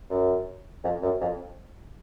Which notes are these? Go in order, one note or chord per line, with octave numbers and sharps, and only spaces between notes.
F#2
F2
F#2
F2